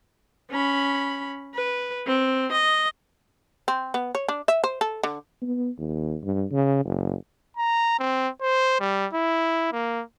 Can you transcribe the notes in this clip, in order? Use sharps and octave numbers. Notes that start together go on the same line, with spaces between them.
C#4 B5
B4
C4
D#5
C4
B3
C#5
D4
E5
C5
A4
D3
B3
D#2
G2
C#3
F#1
A#5
C4
C5
G3
E4
A#3